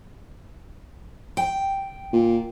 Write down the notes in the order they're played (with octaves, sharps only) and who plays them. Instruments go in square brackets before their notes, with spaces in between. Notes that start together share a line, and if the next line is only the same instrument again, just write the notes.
[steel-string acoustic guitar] G5
[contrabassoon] A#2